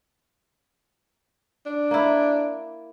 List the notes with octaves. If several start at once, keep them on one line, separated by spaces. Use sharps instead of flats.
D4
A#3 E4